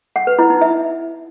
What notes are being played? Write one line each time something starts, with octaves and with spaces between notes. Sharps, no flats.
F#5
B4
E4
D#4
E5